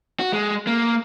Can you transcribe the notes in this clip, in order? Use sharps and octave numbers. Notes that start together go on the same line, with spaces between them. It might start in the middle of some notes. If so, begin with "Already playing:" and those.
F#4
G#3
A#3